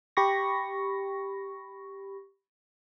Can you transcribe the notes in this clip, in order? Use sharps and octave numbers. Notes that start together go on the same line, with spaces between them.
G4 B5 C#6 A#6